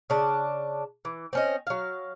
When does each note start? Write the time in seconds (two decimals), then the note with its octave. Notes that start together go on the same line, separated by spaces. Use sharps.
0.10 C#3 D4
1.05 E3
1.33 C4 C#4 D#5
1.67 F#3 F5